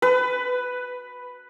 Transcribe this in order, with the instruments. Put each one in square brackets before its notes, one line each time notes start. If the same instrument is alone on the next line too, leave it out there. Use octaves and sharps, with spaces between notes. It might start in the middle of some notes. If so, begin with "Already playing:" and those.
[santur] B4